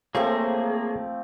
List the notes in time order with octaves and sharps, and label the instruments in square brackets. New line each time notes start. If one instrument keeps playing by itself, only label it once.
[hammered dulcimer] F3 A3 C4 [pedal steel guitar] A#3 [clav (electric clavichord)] G4 C5 C#5 [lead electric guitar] G#4